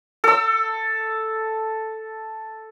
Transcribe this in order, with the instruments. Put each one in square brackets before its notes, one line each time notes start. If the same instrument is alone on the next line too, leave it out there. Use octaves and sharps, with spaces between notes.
[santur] A4 E6